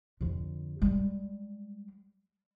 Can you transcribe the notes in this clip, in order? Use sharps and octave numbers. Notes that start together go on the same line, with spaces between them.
F2 D3
G3 G#3